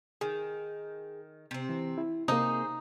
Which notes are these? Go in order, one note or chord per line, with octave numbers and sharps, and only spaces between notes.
D#3 G#4
C3 C4
E3
E4
C3 A#3 D#4 G#4 C5